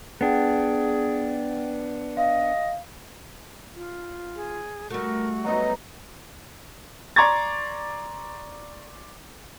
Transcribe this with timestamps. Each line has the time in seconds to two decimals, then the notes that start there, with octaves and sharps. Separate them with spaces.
0.21 B3 D4 G#4 F#5 G5
2.17 D#5 F5
3.74 F4
4.35 G#4
4.90 G3 A3 F#4 A#4
5.44 F#3 B3 D#4 D#5
7.16 D5 A#5 C6 C#6 G#6 A6